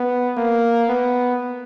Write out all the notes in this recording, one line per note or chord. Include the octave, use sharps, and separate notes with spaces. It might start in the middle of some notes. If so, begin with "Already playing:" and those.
Already playing: B3
A#3
B3